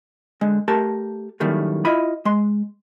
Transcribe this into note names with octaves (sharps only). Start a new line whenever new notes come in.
D3 G#3
A3 G4 A#4 A5
F#2 A2 D#3 G3 A3 A#3
E4 F4 D#5 B5
G#3 C6